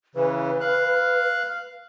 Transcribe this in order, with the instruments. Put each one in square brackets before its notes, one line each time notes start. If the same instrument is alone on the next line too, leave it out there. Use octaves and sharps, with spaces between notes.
[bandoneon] C#3 E3 [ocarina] B4
[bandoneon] F5 F#6